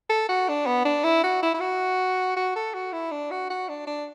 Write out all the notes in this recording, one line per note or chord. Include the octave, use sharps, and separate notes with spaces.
A4
F#4
D4
B3
D4
E4
F#4
E4
E4
F#4
F#4
A4
F#4
E4
D4
F#4
F#4
D4
D4